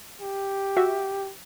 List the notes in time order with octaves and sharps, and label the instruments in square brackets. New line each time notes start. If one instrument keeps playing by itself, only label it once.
[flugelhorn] G4
[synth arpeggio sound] F#4 E5